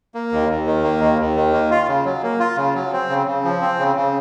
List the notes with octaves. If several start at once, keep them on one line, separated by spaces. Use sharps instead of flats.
A#3
D#2
D#2
D#3
A#3
D#2
D#2
D#3
A#3
F4
C#3
F#3
A#3
F4
C#3
F#3
C4
C#3
C#3
F3
C4
C#3
C#3